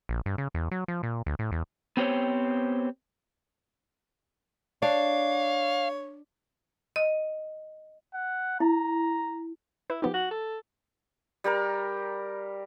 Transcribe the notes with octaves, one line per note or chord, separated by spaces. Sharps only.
A#1
G2
C#3
E2
F#3
F3
A#2
D2
A2
E2
B3 C4 G4 C5 C#5
D4 C#5 F5
D#5
F#5
E4 A#5
E4 B4
F3 B3 D#4 G4
F#4
A4
G3 G4 A#4 A#5